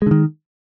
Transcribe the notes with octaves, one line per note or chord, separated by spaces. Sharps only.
D3 D#3 G#3